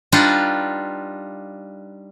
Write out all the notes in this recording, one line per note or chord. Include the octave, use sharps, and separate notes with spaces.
G3 D4 D#4 F4 B4 F#5